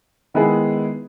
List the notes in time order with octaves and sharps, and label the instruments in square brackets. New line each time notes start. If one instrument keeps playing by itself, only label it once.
[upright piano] D#3 G#3 B3 E4 G#4